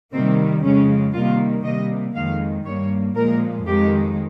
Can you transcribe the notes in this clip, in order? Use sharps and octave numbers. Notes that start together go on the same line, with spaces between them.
C3 D#3 G3 A#3 C4
F2 C#3 G#3 C#4
C3 D#3 G3 A#3 F4
C3 G3 A#3 D#5
F2 D#3 G#3 F5
G2 G3 A#3 C#5
A#2 F3 G#3 A#4
F2 D#3 G#3 G4